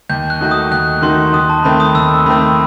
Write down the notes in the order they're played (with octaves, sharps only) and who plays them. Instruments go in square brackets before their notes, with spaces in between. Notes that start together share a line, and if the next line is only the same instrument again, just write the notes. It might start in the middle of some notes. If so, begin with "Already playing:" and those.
[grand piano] D#2 [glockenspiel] G6
[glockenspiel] F#6
[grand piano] D#3 A3 D#4 F#4
[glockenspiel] D#6
[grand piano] D#2 [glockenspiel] F#6
[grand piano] D#3 A3 D#4 F#4 [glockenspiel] C6
[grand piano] D#2 [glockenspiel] D#6
[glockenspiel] A5
[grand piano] D#3 A3 C4 [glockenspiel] B5
[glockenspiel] D#6
[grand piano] D#2 [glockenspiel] E6
[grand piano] D#3 A3 C4 [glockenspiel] B5